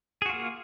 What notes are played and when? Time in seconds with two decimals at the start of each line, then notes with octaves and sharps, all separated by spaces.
0.22 G#4
0.26 F#4
0.30 F4
0.33 A#3